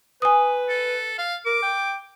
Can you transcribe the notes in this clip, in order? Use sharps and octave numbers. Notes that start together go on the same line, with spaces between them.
B4 G#5 D#6
A4
F5
A#4 D6
G5